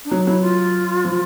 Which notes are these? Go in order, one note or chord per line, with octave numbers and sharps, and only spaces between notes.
D4
F#3 D#4
F#3 E4
F4
F3